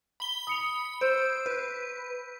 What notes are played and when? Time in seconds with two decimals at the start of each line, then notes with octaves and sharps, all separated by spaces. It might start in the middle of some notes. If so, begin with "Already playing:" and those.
0.20 B5 G7
0.47 B5 D#6 C#7 F7
1.01 C5 E6 G6 D7
1.46 B4